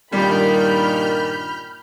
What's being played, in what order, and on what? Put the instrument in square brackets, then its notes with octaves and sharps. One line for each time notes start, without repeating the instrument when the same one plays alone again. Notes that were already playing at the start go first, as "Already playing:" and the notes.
[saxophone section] G2 A#2 D#3 [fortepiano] G3 [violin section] B5 F6 G6